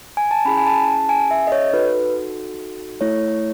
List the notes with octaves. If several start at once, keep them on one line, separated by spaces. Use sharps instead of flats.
G#5
A5
C#4 E4 G#4 B5
G#5
A5
A5
G#5
E5
D#5
C#5
D#4 F#4 A4 B4
A3 E4 A4 C#5